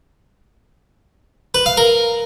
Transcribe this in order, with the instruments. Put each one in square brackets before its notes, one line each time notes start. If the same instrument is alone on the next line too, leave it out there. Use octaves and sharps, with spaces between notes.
[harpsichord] B4
F5
A#4